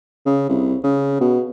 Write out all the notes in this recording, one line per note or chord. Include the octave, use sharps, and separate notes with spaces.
C#3
C2
C#3
B2